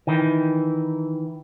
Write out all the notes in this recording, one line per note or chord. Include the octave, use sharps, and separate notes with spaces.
D#3 E3